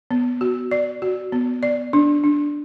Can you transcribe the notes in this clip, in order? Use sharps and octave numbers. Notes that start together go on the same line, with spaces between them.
B3
F#4
D5
F#4
B3
D5
D4
D4